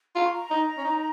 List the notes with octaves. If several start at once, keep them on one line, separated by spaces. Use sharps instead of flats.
F4 A#5
C#6
A#5
D#4
C#4
D#4